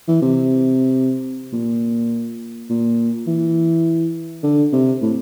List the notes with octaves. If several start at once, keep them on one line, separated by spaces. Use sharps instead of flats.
E3
C3
A#2
A#2
E3
D3
C3
A2